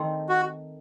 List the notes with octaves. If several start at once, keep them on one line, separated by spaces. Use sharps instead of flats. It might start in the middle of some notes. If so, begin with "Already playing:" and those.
Already playing: D#3 A3 C4 D#4
F#4